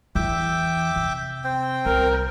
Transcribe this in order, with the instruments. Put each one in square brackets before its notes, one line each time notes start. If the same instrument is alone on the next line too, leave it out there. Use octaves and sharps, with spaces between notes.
[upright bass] E2 E3 [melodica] E5 G5 D6
[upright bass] C3
[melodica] C4 G5
[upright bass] C2 [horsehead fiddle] A#4